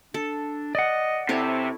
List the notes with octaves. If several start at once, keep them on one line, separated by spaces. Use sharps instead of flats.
D4 A4
D5 D#5 F#5
C3 E4 A4 C5 C#5